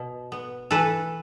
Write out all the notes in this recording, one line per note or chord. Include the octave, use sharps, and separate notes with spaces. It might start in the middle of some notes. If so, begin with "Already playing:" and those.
Already playing: B2
B3
E3 A4 B4